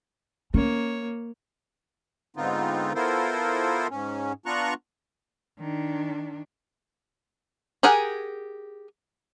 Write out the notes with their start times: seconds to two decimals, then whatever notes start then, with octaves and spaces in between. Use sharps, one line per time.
0.54 A#3 C#4 C#5
2.37 G#2 D3 B3 C4 D#4 F4
2.95 B3 E4 F4 A4 A#4 C5
3.91 G#2 C#4
4.46 B3 D4 F4 A#5 C#6 F#6
5.60 D#3 D4
7.83 G4 G#4 A#4 F#5 G#5